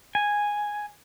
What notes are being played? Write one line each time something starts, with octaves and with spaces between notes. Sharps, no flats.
G#5